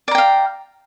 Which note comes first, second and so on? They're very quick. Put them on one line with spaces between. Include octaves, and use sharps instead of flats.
D5 A#5 G5 F5